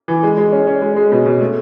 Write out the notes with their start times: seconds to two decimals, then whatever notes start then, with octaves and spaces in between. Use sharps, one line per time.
0.08 E3
0.23 G#3
0.37 G#3
0.52 C#4
0.67 C#4
0.82 G#3
0.96 G#3
1.12 B2
1.26 B2
1.41 A3